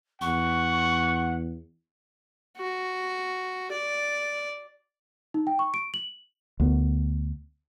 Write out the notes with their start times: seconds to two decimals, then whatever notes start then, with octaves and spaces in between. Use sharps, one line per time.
0.21 E2 F#5 C#6
2.58 F#4
3.72 D5
5.34 D#4
5.47 G5
5.59 C#6
5.74 D7
5.94 F#7
6.60 D2 B3